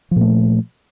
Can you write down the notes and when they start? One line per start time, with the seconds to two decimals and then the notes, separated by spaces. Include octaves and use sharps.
0.11 F3
0.16 A#2
0.21 A3